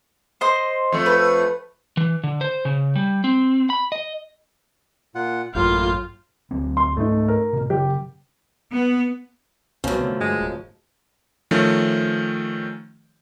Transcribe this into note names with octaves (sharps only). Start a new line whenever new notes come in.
C5 D#5 C6
F2 A3
B4
E3
D3
C5
C#3
G3
C4
B5
D#5
A#2 F4 F#5
A1 F#2 A2 A#3 F4 G6
D2 F#3 C4
C6
G#2 A3 C#4 D#4
A#4
A2 C3
C#3 F#3 G4
B3
C2 F#2 C3 F3 F#3 G#3 B3 C#4
D3 A3
G2 G#3
D1
D#3 F3 A3 C#4